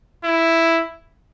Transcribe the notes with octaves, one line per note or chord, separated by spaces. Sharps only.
E4